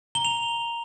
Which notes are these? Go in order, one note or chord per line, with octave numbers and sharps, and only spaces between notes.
A#5 G7
F7